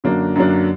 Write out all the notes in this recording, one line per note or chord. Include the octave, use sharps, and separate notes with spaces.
F#2 D3 F#3 A#3 D4
F#2 D3 F#3 A#3 D4